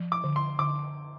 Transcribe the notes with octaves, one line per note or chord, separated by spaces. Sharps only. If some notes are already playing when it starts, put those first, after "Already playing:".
Already playing: F3
D6
D3
C6
D3 D6